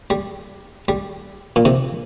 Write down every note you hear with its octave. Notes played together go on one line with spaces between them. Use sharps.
G3
G3
A#2
C3